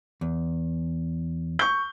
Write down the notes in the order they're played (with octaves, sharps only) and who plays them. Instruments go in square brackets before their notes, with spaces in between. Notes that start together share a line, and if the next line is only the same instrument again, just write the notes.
[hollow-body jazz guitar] E2
[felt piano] C#6 G6